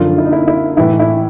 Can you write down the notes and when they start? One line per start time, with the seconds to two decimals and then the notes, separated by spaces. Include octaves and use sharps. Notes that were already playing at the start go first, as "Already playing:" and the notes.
Already playing: F#2 D3 F3 F4
0.18 E4
0.25 D#4
0.32 E4
0.47 E4
0.77 A2 E3 E4
0.99 E4